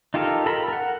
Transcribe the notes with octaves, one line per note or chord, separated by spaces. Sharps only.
D#4 F4 G4 A4 A#4
A4 A#4 A#5 B5
A#4 F#5